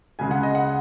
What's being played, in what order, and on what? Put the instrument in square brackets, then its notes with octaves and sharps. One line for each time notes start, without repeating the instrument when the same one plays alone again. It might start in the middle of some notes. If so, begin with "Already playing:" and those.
[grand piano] C#2 C#3 G#3 G#5
F#5
D#5
F#5